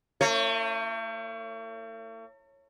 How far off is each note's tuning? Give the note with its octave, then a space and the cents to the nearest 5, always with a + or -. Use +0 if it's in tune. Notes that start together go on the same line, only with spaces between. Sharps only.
A3 +45 E4 +0 C#5 -10